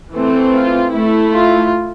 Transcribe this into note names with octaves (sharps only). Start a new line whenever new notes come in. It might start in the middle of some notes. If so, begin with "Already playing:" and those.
E3 A3 C4
F4
A3 E4
F4